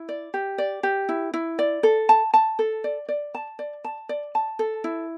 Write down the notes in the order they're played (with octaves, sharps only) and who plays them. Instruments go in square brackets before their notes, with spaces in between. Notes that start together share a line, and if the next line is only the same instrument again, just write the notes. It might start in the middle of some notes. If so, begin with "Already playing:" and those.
Already playing: [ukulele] E4
D5
G4
D5
G4
E4
E4
D5
A4
A5
A5
A4
D5
D5
A5
D5
A5
D5
A5
A4
E4